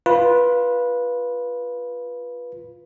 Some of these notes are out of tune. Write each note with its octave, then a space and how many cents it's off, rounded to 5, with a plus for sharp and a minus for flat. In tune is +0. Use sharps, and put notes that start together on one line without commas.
F4 +0 B4 -15